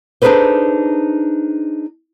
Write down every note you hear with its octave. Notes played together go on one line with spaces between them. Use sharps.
D4 D#4 G#4 A4 B4 C5